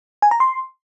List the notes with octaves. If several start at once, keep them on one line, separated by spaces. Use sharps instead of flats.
G#5
A#5
C6